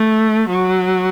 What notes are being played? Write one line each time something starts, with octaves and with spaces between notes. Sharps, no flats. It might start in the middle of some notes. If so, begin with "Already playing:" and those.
Already playing: A3
F#3